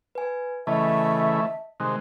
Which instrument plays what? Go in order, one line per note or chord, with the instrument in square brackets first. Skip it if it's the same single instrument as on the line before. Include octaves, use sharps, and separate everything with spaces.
[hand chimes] B4 G#5
[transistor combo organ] C#3 E3 A3 [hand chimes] D#5 A5 [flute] E5
[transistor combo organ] C3 D#3 G#3 [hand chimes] F#6